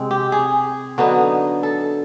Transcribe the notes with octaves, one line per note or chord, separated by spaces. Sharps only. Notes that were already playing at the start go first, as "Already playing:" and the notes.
Already playing: C3 G#3 C4
G4
G#4
D3 F#3 B3 D#4
A4